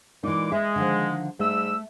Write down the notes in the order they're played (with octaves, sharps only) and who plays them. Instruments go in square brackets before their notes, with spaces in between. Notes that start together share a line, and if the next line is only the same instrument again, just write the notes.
[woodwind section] A#2 G#3 D6 [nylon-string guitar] E3 D#4
[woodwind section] G#3 [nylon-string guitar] E5
[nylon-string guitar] D3 D#3 F3
[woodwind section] G#2 G3 E6 [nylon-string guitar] A3